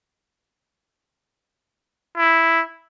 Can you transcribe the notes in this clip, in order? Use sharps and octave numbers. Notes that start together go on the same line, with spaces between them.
E4